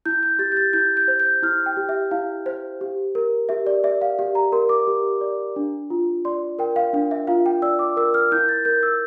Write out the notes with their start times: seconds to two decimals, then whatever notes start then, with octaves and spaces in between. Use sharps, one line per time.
0.05 E4 G6
0.23 G6
0.39 G4 A6
0.52 G6
0.57 A6
0.73 E4 G6
0.97 G6
1.08 C5
1.20 G6
1.43 E4 F6
1.66 G5
1.77 G4
1.89 E5
2.11 E4 F5
2.46 C5
2.81 G4
3.15 A#4
3.49 G4 E5
3.67 D5
3.84 D5 E5
4.02 F5
4.19 G4 F5
4.35 A#5
4.52 A#4 C6
4.69 D6
4.88 G4
5.21 D5
5.56 D4
5.90 F4
6.25 D5 C6
6.59 A#4 G5
6.76 F5
6.93 D4 F5
7.11 E5
7.27 F4 F5
7.46 G5
7.62 D5 E6
7.79 D6
7.97 A#4 E6
8.14 F6
8.32 E4 G6
8.49 A6
8.65 A#4 G6
8.83 E6